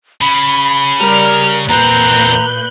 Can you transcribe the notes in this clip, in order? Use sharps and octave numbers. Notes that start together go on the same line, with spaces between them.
C#3 B5
G3 A#4 F6
E2 A#2 C4 B4 A#5 F#6 G6